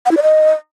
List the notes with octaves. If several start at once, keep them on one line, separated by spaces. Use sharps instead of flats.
F#5
E4
D5
D#5